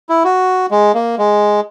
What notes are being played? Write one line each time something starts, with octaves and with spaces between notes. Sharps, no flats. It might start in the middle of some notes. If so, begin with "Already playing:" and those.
E4
F#4
G#3
A#3
G#3